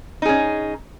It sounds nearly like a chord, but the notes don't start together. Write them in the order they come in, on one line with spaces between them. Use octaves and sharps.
D#4 G#4 C#4